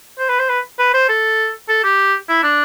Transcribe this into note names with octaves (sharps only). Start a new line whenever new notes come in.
C5
B4
C5
B4
B4
C5
A4
A4
G4
E4
D4